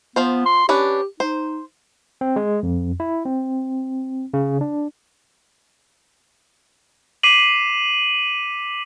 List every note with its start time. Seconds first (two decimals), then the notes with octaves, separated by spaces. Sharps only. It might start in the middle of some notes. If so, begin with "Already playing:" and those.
0.16 F3 B3 F4 C5
0.46 C6
0.69 C#4 D4 G4 B4
1.20 D#4 C5
2.21 C4
2.36 G#3
2.63 F2
3.00 E4
3.25 C4
4.34 C#3
4.61 D4
7.23 D6 B6 C7 D#7 F#7